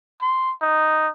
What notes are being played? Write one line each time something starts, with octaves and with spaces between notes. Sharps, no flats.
C6
D#4